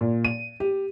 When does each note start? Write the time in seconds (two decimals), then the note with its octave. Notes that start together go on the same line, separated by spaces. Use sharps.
0.01 A#2
0.25 D#7
0.60 G4